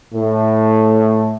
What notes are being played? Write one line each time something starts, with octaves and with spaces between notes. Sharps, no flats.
A2